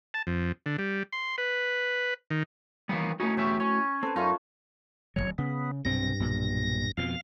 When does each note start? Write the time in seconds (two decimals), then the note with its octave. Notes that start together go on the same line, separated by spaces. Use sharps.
0.14 A5
0.27 F2
0.66 D3
0.78 G3
1.13 C6
1.38 B4
2.31 D#3
2.89 D#3 E3 G3 A#3 B3
3.20 A3 C#4 D#4 E4 F#4
3.37 E2 C#4 G4 E5
3.60 C#4 C#6
4.03 C4 A4 B4
4.16 F#2 A3 C#4 D#4 F4
5.16 D1 D#2 F#3 C#5
5.38 C#3 B3
5.85 B1 G2 C3 C4 A#6
6.20 B1 A#2
6.97 F2 B2 F3 F5